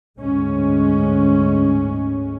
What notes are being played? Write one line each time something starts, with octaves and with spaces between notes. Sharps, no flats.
D2 G#2 G#3 C#4